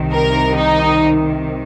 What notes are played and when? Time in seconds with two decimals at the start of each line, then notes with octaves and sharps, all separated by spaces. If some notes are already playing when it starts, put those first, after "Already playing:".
Already playing: C2 C3 D#3
0.13 A#4
0.56 D#4